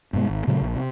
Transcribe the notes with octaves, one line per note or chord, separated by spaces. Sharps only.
G2 B2 G#3
G#1
A#2 C#3 F#3 A3
A#1
C3